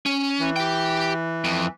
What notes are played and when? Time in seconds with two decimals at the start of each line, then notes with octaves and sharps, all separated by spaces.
0.06 C#4
0.40 E3
0.56 G4 G5
1.45 F2